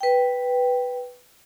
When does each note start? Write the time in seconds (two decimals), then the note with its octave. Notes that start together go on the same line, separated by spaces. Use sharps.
0.01 B4 G5